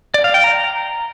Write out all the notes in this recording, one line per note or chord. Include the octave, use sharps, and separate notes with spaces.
D5
F5
G5
A#5